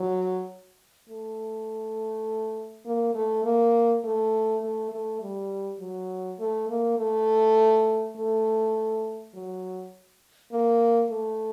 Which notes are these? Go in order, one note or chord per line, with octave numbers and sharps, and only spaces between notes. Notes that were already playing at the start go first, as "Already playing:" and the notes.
Already playing: F#3
A3
A#3
A3
A#3
A3
A3
A3
G3
F#3
A3
A#3
A3
A3
F#3
A#3
A3